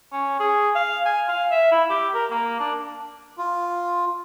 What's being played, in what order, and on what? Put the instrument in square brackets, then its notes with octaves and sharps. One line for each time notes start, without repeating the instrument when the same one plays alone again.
[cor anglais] C#4
G#4
F5
G#5
F5
E5
E4
G4
A#4
A#3
D4
[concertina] F4